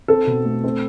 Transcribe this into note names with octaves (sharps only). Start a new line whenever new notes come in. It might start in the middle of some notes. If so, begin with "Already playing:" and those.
C4 A4
B2
A3
C4